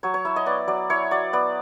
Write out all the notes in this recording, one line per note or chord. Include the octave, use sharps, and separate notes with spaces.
F#3 C#5
C#5
E4 E5
D#5
B3 D5
F#3 D5
E4 C#5
F#3 D5
B3 D5